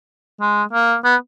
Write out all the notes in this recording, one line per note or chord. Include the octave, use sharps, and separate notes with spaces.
G#3
A#3
B3